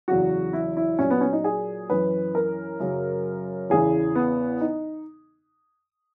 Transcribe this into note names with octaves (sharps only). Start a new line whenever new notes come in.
E2 C#3 F#3 F#4
E4
E4
A#2 F#3 C#4
B3
C#4
D#4
G#4
F#2 E3 B4
A#4
F#2 C#3 F#3
E2 C#3 E3 G#4
B3
D#4